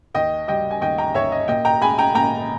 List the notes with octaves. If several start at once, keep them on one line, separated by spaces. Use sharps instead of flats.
D#2 D#5 G5
G3 D#5 G5
G#5
D#2 D#5 G5
G5 A#5
D#2 C#5 E5
D#5
A#2 D#5 G5
G5 A#5
G#3 G#5 B5
G5 A#5
A#2 G5 A#5